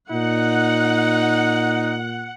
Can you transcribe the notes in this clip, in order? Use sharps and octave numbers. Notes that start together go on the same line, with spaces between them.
A#2 D#4 F#5